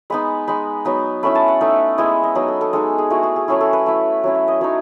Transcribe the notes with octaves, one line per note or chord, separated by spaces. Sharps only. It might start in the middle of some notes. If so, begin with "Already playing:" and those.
G#3 B3 D#4 B5
G#3 D#4 B5
F#3 B3 D#4 B5
A3 C#4 E4 B5
A5
F#5
A3 D#4 E5
G#3 B3 E4 D#5
D#5
F#3 B3 D#4
A4
A4
G#3 D#4 A4
G#4
A3 E4 F#4
G#4
G#4
F#3 A3 C#4 E4 G#4
A4
B4
A3 E4
F#3 C#4 E4
E5
D#5
F#3 A3 D#4 C#5